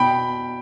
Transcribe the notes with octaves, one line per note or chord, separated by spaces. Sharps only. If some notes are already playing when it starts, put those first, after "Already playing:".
Already playing: B2 G5 B5